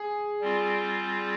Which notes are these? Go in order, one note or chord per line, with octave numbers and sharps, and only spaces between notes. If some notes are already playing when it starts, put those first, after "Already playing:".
Already playing: G#4
G3 C4 F4